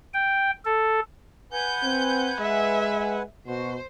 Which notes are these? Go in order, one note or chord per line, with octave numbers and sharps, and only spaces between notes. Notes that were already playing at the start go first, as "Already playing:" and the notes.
G5
A4
B4 F#5 G#5 G6
C4
G#3 E5
B2 F#4 C5